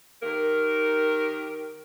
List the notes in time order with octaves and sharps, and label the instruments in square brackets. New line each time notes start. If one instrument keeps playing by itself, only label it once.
[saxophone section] D#3 G4 A#4